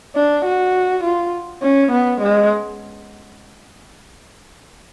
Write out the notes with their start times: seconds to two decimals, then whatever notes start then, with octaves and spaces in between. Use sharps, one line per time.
0.16 D4
0.45 F#4
1.03 F4
1.62 C#4
1.91 B3
2.20 G#3